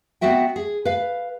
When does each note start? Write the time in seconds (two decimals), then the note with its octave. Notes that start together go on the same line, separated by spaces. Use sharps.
0.21 B3 C4 F#4 E5 G5
0.56 G#4
0.85 B4 F5